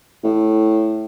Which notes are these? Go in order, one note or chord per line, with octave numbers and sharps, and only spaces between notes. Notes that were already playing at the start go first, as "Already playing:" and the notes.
A2